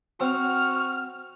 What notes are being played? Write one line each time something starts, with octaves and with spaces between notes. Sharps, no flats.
C4 F#4 F6